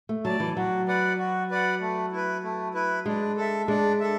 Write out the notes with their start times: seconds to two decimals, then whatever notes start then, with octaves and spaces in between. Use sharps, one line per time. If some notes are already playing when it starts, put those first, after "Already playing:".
0.09 A3
0.25 F#3 D5 A5
0.40 E3
0.57 F#3 F#4
0.88 B4 D5 F#5
1.18 F#4
1.50 B4 D5 F#5
1.81 A3
2.12 E4 B4
2.43 A3
2.74 E4 B4
3.06 G#3 D4
3.37 A4 E5
3.68 G#3 D4
4.00 A4 E5